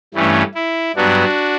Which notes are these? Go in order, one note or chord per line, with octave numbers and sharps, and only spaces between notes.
G2 E3 A3 C#4
E4
G2 F#3 B3 D4 F#4